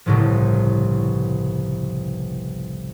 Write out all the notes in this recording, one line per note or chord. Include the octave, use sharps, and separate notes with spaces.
G1 C2 A2 C#3 F3